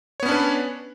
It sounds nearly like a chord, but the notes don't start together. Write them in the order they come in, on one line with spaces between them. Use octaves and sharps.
C#5 B3 C#4 D4 B4